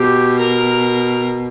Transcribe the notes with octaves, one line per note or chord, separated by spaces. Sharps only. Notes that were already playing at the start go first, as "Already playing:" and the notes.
Already playing: B2 G4
A#4